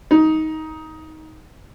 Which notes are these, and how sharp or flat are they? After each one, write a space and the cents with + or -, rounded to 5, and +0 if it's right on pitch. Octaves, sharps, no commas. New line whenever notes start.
D#4 +15